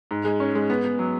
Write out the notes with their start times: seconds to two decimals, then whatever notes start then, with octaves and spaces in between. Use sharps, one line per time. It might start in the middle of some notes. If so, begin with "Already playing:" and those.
0.11 G#2
0.25 G#3
0.40 C#4
0.55 G#3
0.70 B3
0.85 B3
0.99 F#3